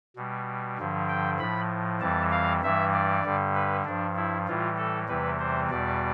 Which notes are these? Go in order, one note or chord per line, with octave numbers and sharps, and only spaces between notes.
B2 G3
G2 D3 F3
G5
A2 F3 B5
F2 E3 G3 A5
F5
G2 E3 G3 E5
D5
G2 D3 G3
B4
G2 F3 D4
E4
A2 E3 G3 F4
A4
E2 C3 E3 G3 B4
C5
E2 B2 G3 D5